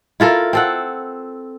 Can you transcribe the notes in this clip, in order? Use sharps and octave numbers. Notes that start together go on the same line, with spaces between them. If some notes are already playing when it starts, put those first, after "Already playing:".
E4 F4 A4 A#4
C4 A4 F#5